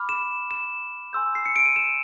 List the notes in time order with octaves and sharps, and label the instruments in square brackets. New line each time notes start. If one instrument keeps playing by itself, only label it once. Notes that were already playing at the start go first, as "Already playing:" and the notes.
Already playing: [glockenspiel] B5 D6 F6
E7
E7
G#5 C6 E6 G6
C7
C#7
D7
D#7
E7